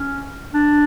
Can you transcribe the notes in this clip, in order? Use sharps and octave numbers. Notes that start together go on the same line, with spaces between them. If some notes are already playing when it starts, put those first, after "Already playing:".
Already playing: C#4
D4